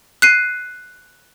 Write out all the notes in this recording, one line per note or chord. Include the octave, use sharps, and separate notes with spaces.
F#6 C7 D#7